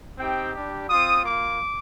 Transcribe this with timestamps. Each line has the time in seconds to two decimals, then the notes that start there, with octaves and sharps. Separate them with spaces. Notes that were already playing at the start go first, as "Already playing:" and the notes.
0.18 C4 D#4 G4 G5
0.54 G3 D4 G4
0.89 C4 F4 D#6
1.25 A#3 F4 D6